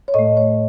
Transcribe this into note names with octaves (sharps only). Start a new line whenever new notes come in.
C#5
A2 A3 D#5
C#5